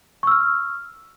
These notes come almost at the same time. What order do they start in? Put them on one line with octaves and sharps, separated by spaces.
C#6 E6 F6